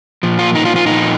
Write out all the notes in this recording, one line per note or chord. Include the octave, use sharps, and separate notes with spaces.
A#2 F3
F4
D#4
F4
F4
A#2 F3 D#4